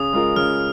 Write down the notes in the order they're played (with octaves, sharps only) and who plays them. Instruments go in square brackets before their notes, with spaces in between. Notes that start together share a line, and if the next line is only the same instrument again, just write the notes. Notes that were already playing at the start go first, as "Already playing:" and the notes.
Already playing: [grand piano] C#3 [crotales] D#6
[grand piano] G#3 F4 A#4
[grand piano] C#3 [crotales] F6